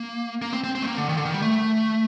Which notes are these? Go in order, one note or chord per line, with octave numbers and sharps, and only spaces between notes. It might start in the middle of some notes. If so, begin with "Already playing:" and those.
Already playing: A#3
A#3
C4
C4
C4
A3
A#3
D3
D#3
D3
D#3
G3
A3